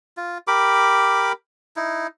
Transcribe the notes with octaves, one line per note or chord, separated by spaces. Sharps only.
F4
G4 A#4 B5 D6
D#4 E4